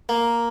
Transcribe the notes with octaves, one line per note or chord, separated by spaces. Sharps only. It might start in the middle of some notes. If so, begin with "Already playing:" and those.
A#3